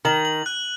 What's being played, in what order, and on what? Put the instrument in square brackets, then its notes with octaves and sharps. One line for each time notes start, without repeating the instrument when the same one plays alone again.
[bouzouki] D#3 [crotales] F#7
[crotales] F#7
F#6